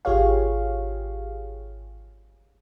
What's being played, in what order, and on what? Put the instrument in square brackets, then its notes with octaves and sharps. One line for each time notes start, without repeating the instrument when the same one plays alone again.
[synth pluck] G#1 F4 G4 G#4 C#5 F5